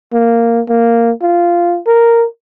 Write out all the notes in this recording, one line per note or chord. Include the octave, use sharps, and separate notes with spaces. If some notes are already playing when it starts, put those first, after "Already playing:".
A#3
A#3
F4
A#4